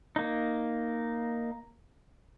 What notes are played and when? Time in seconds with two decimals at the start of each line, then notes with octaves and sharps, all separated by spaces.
0.16 A#3 D#4